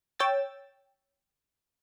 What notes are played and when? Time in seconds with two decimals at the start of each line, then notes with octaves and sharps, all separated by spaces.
0.19 C#5 G5 E6 A6